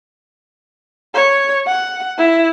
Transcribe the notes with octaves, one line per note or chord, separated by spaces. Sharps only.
C#5
F#5
E4